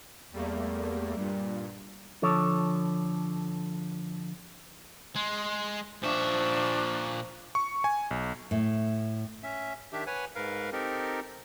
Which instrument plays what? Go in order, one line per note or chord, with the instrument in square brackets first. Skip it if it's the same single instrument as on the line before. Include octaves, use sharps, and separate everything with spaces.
[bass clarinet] E2 [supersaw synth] G3 A3 A#3
[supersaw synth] G2 A#2 [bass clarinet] G3
[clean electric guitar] D3 F3 A4 C#5
[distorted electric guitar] G#3 [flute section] C6
[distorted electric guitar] A#2 E5 [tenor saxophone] F3 [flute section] D4 C#6 D6
[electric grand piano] C#6
G#5
B1
[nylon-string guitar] A2
[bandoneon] C#4 E5
D#3 D4 G4 E5
B4 C#5 F#5 G#5
G#2 A#4 B4 F5
C4 D#4 G4 A4 A#4